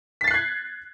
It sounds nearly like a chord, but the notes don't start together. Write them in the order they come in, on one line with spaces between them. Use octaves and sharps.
B6 A6 C7 F#6 G#6